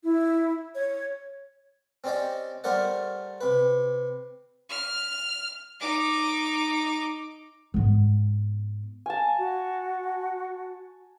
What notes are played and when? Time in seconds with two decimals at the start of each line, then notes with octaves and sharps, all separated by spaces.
0.04 E4
0.75 C#5
2.04 C4 C#4 G4 D5 D#5 G5
2.64 G3 A3 A#4 C5 D5 F#5
3.41 C3 B4
4.69 F6
5.80 D#4 D6
7.74 G#2 B3
9.06 G#5 A5
9.38 F#4